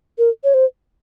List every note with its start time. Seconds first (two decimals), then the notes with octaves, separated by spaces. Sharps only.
0.18 A#4
0.44 C#5
0.54 C5